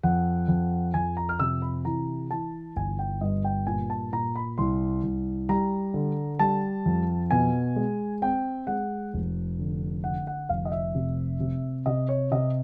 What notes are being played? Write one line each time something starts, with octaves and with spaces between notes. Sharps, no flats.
F2 F#5
F2
F2 G#5
A#5
F6
C3 E6
B5
E3 A#5
E3 A5
G1 G#5
G5
G2 D#5
G5
A#2 G#5
A5
A#2 A#5
B5
C2 C6
C2
G3 A#5
D3
G3 A5
F2
B2 G#5
G#3
C4 G5
G#3 F#5
F1
D3
D3 F#5
F#5
F1 F5
D#5
E5
C3
C3
C3 D#5
C#5
C3 D#5